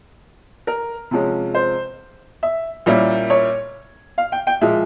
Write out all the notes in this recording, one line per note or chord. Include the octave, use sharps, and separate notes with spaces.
A#4
C3 F3 G#3 C#4
C5
E5
A#2 G3 A#3 C#4 E4
C#5
F5
G5
G5
A#2 F3 G#3 E5